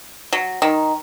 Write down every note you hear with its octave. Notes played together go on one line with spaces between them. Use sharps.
F#3
D#3